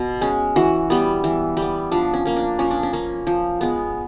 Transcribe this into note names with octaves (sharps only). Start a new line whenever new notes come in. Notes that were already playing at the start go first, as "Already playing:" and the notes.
Already playing: B2
G#3 C#4
E3 F#4
G3 B3
E3
G3
B3
F3 D4
C#4
A#3 C#4
D4
F3 C#4
D4
C#4
A#3 C#4
F3
G#3 B3